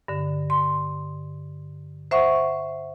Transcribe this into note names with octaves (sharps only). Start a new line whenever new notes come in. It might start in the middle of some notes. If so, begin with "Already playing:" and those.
G2 D3
C6
C5 E5 F#5 C#6